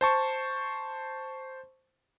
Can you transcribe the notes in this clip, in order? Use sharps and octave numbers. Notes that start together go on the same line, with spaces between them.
C5 A5 C#6